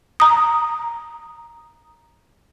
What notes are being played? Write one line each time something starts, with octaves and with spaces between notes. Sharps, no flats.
A#5 D#6